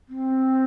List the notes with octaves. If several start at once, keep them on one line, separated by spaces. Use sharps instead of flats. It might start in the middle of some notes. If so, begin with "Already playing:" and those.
C4